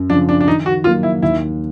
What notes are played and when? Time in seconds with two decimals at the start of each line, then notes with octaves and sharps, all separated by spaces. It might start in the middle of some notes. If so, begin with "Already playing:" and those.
Already playing: F#2
0.10 C#3 F3 D4
0.29 D4
0.41 D4
0.48 D#3 D#4
0.66 F#4
0.84 F#3 A#3 F4
1.03 E4
1.22 D#2 E4